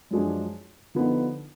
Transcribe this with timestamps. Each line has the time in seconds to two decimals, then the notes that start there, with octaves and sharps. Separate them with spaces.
0.11 F#2 F3 G#3 D4 G#4
0.95 D3 F3 B3 D#4